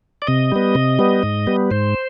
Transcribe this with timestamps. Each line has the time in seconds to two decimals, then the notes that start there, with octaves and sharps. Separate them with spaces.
0.22 D5
0.27 C3 D#5
0.52 G3 B3
0.75 C3
0.99 G3 B3
1.23 G#2
1.47 G3 B3
1.71 G#2 C5